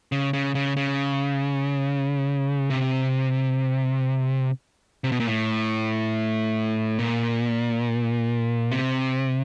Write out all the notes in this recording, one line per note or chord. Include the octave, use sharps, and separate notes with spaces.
C#3
C#3
C#3
C#3
C3
C3
B2
A#2
A2
A#2
C3